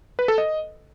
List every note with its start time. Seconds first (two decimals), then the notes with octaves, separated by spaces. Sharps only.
0.19 B4
0.28 A4
0.38 D#5